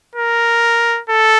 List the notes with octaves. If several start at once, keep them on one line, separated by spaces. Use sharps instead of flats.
A#4
A4